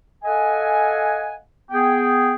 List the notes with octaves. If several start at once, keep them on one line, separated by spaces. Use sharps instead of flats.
A4 D#5 F5 F#5 G#5
B3 G#4 G5